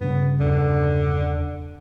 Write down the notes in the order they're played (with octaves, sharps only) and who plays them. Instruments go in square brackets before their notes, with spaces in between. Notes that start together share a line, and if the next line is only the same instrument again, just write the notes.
[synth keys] G2 C#3 [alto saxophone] B3
[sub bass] E2 [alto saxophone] D3